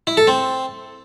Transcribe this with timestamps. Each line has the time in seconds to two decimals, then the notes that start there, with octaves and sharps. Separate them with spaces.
0.07 E4
0.17 A4
0.27 C4